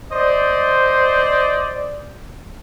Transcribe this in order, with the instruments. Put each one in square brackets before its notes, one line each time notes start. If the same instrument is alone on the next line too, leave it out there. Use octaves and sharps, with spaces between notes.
[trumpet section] C5 D5 D#5